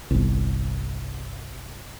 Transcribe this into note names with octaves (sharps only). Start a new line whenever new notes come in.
G1 C2